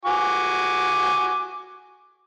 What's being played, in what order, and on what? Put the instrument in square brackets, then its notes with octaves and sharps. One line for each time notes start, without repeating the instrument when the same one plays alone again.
[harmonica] F#4 G#5 D6